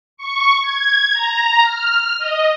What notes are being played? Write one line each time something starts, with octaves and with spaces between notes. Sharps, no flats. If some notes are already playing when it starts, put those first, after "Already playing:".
C#6
G#6
A#5
F6
D#5